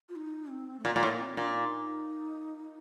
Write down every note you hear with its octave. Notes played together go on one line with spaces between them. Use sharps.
F4
D#4
C4
A3
A#2 A#3
A#2 A3
A2 A#3
C4
A#2 D4
D#4